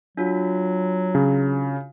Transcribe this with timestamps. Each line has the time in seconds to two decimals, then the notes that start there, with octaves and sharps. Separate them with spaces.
0.17 F#3 D4 F4 F#4
1.15 C#3